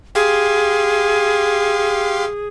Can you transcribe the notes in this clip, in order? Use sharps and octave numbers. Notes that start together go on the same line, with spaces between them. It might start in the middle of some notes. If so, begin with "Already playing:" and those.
G4 G#4 F5 C6